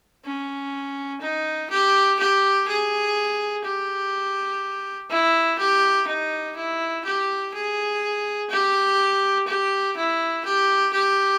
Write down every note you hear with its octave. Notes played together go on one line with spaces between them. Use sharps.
C#4
D#4
G4
G4
G#4
G4
E4
G4
D#4
E4
G4
G#4
G4
G4
E4
G4
G4